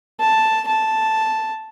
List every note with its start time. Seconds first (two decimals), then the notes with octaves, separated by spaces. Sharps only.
0.20 A5
0.67 A5